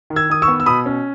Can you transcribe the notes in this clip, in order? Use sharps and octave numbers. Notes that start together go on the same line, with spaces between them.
D#3
E6 G#6
D#3 D#6
C#6 E6
B3
E6
B2 B5 D#6
C#4